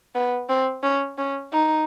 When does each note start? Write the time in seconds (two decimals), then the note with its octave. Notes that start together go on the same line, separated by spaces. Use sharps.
0.15 B3
0.49 C4
0.83 C#4
1.18 C#4
1.53 D#4